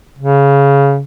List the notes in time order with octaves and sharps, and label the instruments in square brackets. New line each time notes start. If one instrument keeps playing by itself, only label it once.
[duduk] C#3